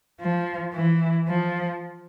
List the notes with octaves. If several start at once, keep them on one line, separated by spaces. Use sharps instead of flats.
F3
E3
F3